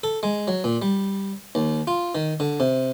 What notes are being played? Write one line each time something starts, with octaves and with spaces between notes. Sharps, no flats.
A4
G#3
F#3
A#2
G3
D#2
F4
D#3
D3
C3